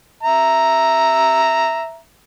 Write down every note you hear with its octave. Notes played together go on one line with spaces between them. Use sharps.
E5 A#5